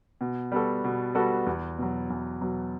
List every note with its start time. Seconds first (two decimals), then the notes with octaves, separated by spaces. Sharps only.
0.21 B2
0.52 G3 B3 F#4 A4
0.84 B2
1.15 G3 B3 F#4 A4
1.46 E2
1.78 B2 F#3
2.10 E2
2.41 B2 F#3